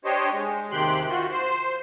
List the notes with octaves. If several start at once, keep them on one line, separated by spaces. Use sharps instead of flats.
D4 G4 C5 C#5 D#5
G#3
D#2 C3 D#3 G4 C6 F#6
F4 F#4
C5